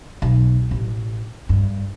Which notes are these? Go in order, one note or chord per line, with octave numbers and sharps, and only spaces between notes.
B1
A1
G2